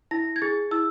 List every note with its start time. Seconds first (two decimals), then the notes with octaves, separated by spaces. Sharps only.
0.11 E4 A#6
0.36 G#6
0.42 G#4 A6
0.71 E4 E6